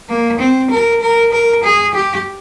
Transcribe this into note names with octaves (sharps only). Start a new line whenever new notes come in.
A#3
C4
A#4
A#4
A#4
G#4
G4